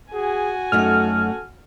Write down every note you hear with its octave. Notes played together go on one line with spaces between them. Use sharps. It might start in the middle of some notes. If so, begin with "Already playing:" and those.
F#4 G#4 G#5
F#2 A3 D#4 A4 F6